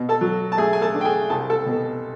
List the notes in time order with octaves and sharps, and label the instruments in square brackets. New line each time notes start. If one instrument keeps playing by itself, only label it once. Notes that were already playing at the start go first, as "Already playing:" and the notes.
Already playing: [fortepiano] B2
A4 A5
F#3
A5
A3 G#4 G#5
G#5
A4 A5
D4
G5
G#4 G#5
C2 A5
A4 A5
B2